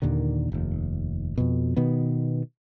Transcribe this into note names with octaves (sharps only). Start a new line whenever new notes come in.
D#2 A#2 D3 D#3
F1 D#2
F2 B2
B2 D#3 B3